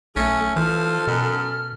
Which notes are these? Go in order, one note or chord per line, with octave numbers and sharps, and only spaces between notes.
B1 A3 C#4
E3 F3 A4 F6
F#2 B2